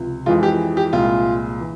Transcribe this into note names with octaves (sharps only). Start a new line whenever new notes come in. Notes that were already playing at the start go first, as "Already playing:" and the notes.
Already playing: C#2 C3 F3
F2 E3 G#3 F4
G4
G4
C2 A#2 F3 G#3 F4
E3